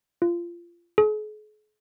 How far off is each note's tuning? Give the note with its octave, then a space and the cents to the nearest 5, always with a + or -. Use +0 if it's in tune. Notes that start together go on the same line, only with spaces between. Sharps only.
F4 -25
G#4 +45